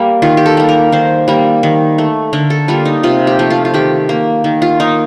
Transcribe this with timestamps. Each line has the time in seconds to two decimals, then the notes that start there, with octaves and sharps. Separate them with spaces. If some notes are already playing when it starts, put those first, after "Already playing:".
Already playing: G3 A#3
0.22 D#3 F4
0.37 G4
0.46 A4
0.57 G3 A#3
0.69 A#4
0.92 D#3 C5
1.28 G3 A#3
1.63 D#3
1.98 A3
2.33 D3 A#4
2.50 A4
2.68 G3 A#3 F4
2.85 D#4
3.03 C3 F4
3.27 G4
3.39 F3 A3
3.50 F4
3.65 F4
3.74 D#3 G4
4.09 A#3
4.44 D#3
4.62 F4
4.80 A#3 D#4